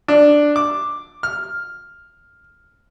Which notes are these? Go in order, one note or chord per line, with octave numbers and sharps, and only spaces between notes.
D4
D6
F6